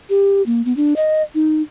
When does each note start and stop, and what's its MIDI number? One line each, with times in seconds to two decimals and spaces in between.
0.10 0.42 67
0.46 0.64 58
0.65 0.75 59
0.77 0.94 62
0.96 1.22 75
1.35 1.62 63